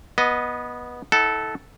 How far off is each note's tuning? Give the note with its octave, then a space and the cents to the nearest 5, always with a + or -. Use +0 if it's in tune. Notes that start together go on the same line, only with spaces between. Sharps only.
B3 -15 D#5 +0
E4 -45 A4 -5 F#5 +20